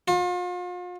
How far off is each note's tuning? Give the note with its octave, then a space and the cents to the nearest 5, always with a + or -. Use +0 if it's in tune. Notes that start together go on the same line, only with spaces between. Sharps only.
F4 +40